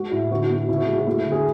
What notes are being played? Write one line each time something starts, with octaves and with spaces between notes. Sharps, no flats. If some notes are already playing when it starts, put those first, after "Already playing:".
Already playing: G#3 F#4
A2 E4
D3 F#4
E4
B3 F#4
C#3 E4
F#4
G#3 G#4
F#4
A3 E4
F#4
D3
G#4